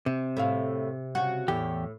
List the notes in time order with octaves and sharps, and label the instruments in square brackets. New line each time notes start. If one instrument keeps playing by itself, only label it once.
[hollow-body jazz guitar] C3
[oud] A2 E5 F5
C#3 F#4
[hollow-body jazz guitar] E2 G4 [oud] A2